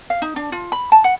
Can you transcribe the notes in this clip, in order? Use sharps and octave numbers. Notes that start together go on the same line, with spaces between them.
F5
D#4
D4
F4
B5
A5
F#5